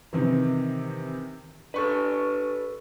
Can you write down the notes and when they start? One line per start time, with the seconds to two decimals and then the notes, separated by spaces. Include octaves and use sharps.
0.13 C3 D#3 E3
1.74 D4 A4 B4 C#6